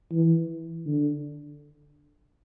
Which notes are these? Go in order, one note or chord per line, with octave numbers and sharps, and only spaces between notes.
E3
D3